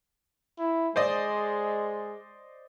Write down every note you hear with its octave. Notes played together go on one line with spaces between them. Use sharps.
E4
G#3 C5 D5 D#5